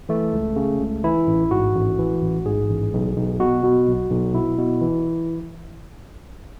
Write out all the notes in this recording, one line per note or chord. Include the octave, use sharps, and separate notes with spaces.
E3 A3
C#2
C#3
C#2
E3 E4
A1
G#2 F#4
A1
E3
A1
G#2 G#4
A1
B1
B1
B2 F#4
B2
B1
B1
B2 E4
B2
E3